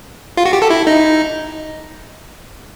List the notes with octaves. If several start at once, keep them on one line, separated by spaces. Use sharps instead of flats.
F4
F#4
G4
A4
E4
D#4